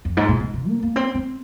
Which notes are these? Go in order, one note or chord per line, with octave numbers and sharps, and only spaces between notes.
F2
G#2
A#2
C3
C3
A#3
A#3
C4
C4